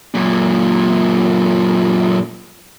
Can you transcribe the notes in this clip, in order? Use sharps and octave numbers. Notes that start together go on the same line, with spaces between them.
F#2 A#2